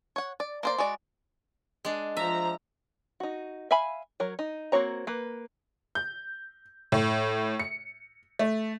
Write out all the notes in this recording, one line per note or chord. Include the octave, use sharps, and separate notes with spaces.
C#5 F#5
D5
A#3 C5 D5
G#3 F#4 D5
G#3 D4
F3 E5 A#5
D#4 F#4
E5 F5 G#5 B5
F#3 A#4 C#5
D#4
A#3 C4 F#4 C#5 A#5
A#3 B4
G6
A2
C#7
A3